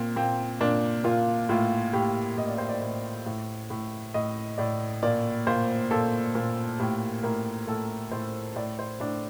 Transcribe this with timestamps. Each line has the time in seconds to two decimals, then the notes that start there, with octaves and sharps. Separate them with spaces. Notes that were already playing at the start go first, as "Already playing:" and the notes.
Already playing: A#2 C4
0.16 A#2 C4
0.61 A#2 D4
1.04 A#2 F4
1.49 A2 F4
1.93 A2 G4
2.37 A2 D#5
2.48 D5
2.58 C5
2.69 D5
2.82 A2
3.26 A2
3.70 A2
4.14 A2 D#5
4.58 A2 D5
5.03 A#2 D5
5.47 A#2 C5
5.91 A#2 A4
6.35 A#2
6.80 A2 G4
7.23 A2 A#4
7.67 A2 A4
8.12 A2 C5
8.56 A2 D5
8.79 C5
9.00 A2 D4